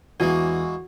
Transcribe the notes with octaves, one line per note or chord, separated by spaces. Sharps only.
E2 E3 G#3 A#3 F#4